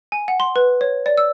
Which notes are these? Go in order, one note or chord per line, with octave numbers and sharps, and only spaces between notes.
G#5
F#5
C6
B4
C#5
D5
E6